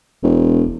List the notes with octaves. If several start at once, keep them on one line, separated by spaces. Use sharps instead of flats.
E1